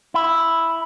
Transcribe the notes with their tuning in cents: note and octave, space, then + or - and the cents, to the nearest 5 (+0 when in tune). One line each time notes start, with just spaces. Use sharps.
E4 +0